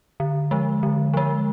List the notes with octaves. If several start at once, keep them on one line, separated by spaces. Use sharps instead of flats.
D3
F3 G#3
D3
F3 G#3